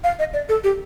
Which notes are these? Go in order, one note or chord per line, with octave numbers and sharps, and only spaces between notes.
F5
D#5
D5
A4
G4